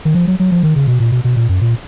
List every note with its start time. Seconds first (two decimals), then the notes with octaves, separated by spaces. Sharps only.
0.05 D#3
0.15 F3
0.27 F#3
0.40 F#3
0.51 F3
0.63 D#3
0.76 C#3
0.88 B2
1.00 A#2
1.12 B2
1.24 B2
1.37 A#2
1.49 F#2
1.61 A#2